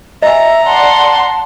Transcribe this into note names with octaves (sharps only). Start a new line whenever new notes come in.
D#5 E5 G#5 A#5
D5 F#5 A5 C6